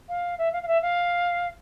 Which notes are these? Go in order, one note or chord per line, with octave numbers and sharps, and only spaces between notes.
F5
E5
F5
F5
E5
F5